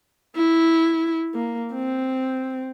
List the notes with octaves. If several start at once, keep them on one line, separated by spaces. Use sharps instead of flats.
E4
A#3
C4